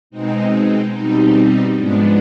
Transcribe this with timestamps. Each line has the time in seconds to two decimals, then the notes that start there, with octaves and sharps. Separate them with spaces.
0.10 B2 G#3 C4 D#4
0.92 B2 G3 C4 D#4
1.75 G#2 F3 G#3 B3 D4